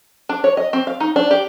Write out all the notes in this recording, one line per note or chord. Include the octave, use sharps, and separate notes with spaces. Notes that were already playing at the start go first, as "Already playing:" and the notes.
D4
C#5
D#5
C4
F5
D#4
D4
G4